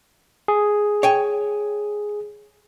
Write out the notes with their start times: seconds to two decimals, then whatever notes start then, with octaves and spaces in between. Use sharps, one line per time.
0.48 G#4
1.03 C#5 G5 G#5